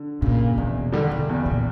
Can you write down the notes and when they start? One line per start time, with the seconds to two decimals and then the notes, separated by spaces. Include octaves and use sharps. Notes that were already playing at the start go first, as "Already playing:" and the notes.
Already playing: D3
0.21 A#2 C#3
0.58 E2 B2
0.92 D3 G3
1.11 D3
1.29 E2 B2
1.46 A#2